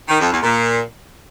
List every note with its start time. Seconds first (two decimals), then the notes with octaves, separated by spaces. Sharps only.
0.09 D#3
0.20 F2
0.31 E2
0.43 A#2